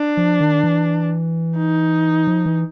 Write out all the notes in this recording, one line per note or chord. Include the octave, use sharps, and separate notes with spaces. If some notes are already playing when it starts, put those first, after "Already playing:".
Already playing: D4
F3
D#3
E3
D#4
F3
E3